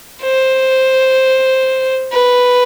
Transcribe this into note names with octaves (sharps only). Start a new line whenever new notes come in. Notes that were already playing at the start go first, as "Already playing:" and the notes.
C5
B4